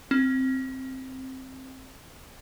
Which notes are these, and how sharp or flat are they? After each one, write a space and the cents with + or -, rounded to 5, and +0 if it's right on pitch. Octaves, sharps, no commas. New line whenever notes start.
C4 +5